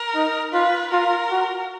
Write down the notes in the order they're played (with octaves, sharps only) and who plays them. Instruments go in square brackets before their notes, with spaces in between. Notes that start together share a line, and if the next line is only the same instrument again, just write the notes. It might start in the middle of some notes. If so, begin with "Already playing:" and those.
Already playing: [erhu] A#4
[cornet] D#4
[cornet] F4 [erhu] B4
[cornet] F4 [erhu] A#4
[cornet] F#4